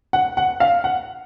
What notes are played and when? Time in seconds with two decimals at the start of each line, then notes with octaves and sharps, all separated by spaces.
0.13 F#5
0.37 F#5
0.60 F5
0.84 F#5